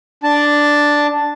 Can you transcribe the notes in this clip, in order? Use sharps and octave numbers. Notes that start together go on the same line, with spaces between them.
D4 A5